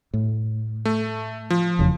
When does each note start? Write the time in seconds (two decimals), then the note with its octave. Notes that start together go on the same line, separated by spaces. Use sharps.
0.14 A2
0.85 A3
1.50 F3
1.79 F1 E2 C#3